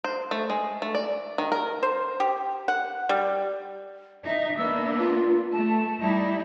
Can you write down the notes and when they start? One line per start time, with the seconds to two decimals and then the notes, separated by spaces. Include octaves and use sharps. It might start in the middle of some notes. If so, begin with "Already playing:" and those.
0.04 C5
0.31 A3
0.50 G#3
0.82 A3
0.95 D5
1.38 D#3
1.52 A#4
1.83 C5
2.20 G4
2.68 F#5
3.09 G3
4.26 D#4 E5
4.57 A#3 B3 D4 E6
4.98 F4
5.52 A3 A5
6.00 G3 D#4 E4